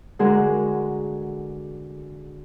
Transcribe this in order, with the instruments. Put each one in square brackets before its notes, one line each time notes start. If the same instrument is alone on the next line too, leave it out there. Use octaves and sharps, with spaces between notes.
[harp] D3 G#3 F#4 G#4 A#4